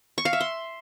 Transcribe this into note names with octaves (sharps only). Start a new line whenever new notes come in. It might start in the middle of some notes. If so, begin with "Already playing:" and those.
C#6
F5
E5
C6